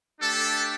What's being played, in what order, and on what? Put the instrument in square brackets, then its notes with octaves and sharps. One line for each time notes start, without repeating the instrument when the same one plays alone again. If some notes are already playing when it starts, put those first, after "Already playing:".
[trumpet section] A3 D4 G4 A4